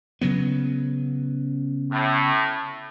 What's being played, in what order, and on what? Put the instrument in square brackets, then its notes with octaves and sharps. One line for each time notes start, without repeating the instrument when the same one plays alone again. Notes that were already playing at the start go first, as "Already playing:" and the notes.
[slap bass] C#3 F#3 B3
[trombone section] A2